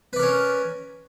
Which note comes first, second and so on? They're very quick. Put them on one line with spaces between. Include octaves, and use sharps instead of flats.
B4 D5 A#4 C#4